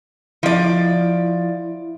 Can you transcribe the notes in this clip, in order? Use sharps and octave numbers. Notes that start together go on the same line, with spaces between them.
F3 E4 D5